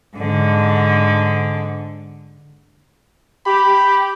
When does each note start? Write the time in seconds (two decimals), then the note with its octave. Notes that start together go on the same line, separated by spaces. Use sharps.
0.17 G#2 D3
3.46 G4 B5